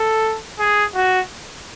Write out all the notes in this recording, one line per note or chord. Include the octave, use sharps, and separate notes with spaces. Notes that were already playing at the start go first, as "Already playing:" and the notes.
Already playing: A4
G#4
F#4